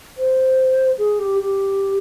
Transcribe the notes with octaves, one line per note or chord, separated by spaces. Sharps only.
C5
G#4
G4
G4